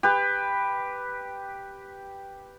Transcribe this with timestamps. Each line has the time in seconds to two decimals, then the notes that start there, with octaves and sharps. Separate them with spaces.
0.03 G4 B4